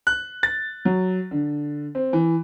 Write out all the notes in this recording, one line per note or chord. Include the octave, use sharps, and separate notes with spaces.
F#6
A6
F#3
D3
C4
E3